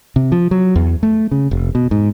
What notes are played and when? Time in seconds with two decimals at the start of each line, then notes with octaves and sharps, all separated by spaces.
0.16 C3
0.32 F3
0.51 F#3
0.76 E2
1.03 A3
1.31 C#3
1.51 F1
1.75 B2
1.91 G#2